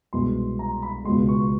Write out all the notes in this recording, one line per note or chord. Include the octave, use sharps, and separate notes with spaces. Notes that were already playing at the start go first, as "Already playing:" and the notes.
C2 B2 G#3 C6
A#5
B5
C#2 B2 G#3 C6
C#6